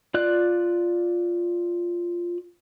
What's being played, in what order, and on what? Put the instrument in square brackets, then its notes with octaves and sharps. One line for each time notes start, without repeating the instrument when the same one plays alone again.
[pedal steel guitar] F4 D5 F#6